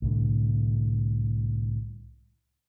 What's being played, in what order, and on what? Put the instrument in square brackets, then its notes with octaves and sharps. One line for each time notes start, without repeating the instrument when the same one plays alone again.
[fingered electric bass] C2 A2 D3